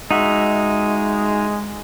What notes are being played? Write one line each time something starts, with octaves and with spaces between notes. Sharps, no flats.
G#3 D#4 F#4 E5